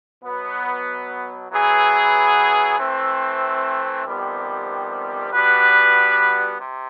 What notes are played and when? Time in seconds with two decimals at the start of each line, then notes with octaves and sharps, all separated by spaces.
0.23 B2 F#3 B3
1.50 F#3 B3 E4 G#4 B4
2.77 E3 A3 C4
4.05 F2 C3 D#3 G3 B3
5.32 G3 B3 D4 F#4 B4
6.59 C3